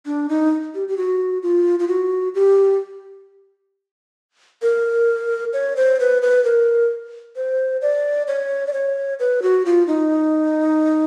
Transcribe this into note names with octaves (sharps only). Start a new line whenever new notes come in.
D4
D#4
G4
G4
F#4
F4
F4
F#4
G4
A#4
C#5
C5
B4
B4
A#4
C5
D5
C#5
D5
C#5
B4
F#4
F4
D#4